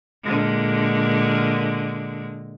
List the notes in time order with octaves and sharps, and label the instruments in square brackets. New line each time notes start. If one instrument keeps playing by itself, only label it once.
[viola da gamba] A#2 D3 G#3